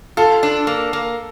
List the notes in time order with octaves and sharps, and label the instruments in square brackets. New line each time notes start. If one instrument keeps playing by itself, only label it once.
[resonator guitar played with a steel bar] F4 [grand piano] A4
[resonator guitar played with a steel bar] D4
A#3
A#3